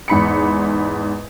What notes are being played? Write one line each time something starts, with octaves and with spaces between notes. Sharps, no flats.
E2 G#2 B5 C#7